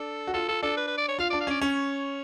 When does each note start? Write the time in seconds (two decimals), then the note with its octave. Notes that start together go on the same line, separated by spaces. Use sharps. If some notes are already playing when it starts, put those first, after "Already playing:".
Already playing: D4 A4
0.27 F#4
0.34 F4 A4
0.48 F4 A4
0.63 D4 A4
0.77 B4
0.87 B4
0.97 D5
1.08 C#5
1.19 F4 F5
1.30 D4 D5
1.41 F5
1.47 C#4 D5
1.61 C#4 C#5